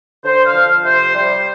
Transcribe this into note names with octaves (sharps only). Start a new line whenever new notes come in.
D3 C5
F5
F3
C3 C5
G3 C5